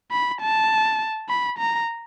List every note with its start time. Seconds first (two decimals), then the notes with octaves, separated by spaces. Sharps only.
0.11 B5
0.41 A5
1.29 B5
1.59 A#5